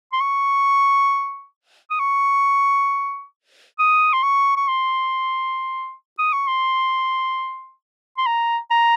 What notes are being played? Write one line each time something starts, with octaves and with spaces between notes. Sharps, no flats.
C6
C#6
D#6
C#6
D#6
C6
C#6
C#6
C6
D#6
C#6
C6
C6
A#5
A#5